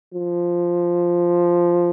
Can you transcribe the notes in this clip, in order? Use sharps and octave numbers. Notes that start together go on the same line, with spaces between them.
F3